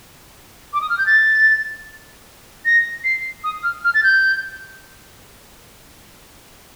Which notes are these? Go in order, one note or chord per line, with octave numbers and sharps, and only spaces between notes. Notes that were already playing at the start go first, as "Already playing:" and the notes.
D6
D#6
F6
G6
A6
A#6
C7
D#6
F6
F6
A6
G6